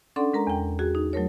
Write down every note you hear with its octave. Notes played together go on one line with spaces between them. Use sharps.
C#4 D4 A4 D5 F#5 C6
G#3 A#4 A#5
E2 G5
F#4 G#4
D#4
F#3 A3 A#4 C#5